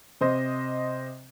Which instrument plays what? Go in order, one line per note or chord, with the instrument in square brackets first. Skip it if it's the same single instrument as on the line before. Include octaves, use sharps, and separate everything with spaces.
[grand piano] C3 C5 D#5